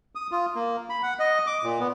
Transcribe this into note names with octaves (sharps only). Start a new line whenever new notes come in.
D#6
F4
A#3
B5
F#5
D#5
D6
A#2
B3